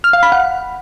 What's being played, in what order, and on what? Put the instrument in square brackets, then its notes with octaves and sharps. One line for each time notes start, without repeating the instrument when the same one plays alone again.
[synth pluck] F6
F5
B5
F#5